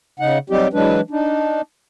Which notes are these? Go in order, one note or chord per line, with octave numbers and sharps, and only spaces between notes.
C#3 D#4 F#5
F#3 G3 C4 D#4 G4
E3 F#3 G#3 D4 B4
D4 D#4